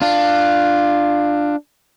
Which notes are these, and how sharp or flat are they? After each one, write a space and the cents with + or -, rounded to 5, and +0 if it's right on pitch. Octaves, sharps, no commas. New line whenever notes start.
D4 +15 F4 +0